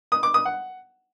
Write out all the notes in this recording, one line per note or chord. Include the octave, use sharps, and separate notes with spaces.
D#6
D6
D#6
F#5